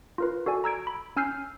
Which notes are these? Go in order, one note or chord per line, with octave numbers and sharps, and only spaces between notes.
F4 A#4 B4
F#4 A4 D5 G#5
A#5 E6 G#6 D7
B5
C#4 G#5 E6 F6 G6 C7